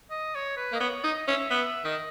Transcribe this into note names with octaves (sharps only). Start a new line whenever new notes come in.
D#5
C#5
B4
A#3 D#5
B3 C#5
D#4 D#5
C#4 E5
B3 E5
D#3 D#5